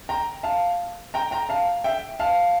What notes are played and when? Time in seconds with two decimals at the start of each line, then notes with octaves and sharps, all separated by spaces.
0.09 G5 A#5
0.43 F5 A5
1.14 G5 A#5
1.31 G5 A#5
1.49 F5 A5
1.84 E5 G5
2.20 F5 A5